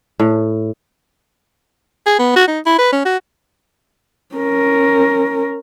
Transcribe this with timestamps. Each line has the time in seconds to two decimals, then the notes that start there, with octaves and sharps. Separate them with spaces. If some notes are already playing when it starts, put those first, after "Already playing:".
0.19 A2
2.06 G#4
2.19 B3
2.36 F#4
2.48 D#4
2.66 E4
2.79 B4
2.93 C#4
3.05 F#4
4.35 C#4 A#4